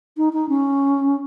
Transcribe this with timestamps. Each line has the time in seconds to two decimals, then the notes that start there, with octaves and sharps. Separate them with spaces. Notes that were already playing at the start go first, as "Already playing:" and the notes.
0.17 D#4
0.33 D#4
0.49 C#4